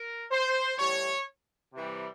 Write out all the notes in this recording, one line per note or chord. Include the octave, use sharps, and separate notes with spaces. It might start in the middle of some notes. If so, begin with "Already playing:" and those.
Already playing: A#4
C5
A2 E3 G3 C#5
C3 E3 G3